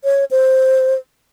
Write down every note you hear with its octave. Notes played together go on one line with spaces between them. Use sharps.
C#5
C5